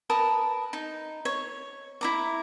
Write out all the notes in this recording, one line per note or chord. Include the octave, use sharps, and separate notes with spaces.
A#4 B4 A5 D#6
D#4
C#5
E4 A#5 D6